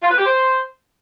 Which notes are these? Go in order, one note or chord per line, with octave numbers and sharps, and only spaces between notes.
F4
B4
G4
C5